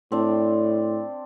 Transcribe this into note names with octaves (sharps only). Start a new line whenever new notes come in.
A2 C4 D4 D5